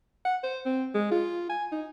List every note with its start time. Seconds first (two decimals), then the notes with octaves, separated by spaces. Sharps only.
0.25 F#5
0.43 C5
0.65 C4
0.95 G#3
1.12 F4
1.49 G#5
1.72 D#4